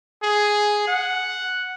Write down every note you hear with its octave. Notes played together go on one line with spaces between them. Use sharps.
G#4
F#5